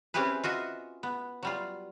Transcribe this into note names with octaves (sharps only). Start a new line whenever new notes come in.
C4 C#4 E4 G4 G#4 B4
F4 F#4 D#5 E5
B3
F#3 G3 F4